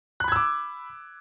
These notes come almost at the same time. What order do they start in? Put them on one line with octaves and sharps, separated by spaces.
F#6 B5 G#6 E6 D6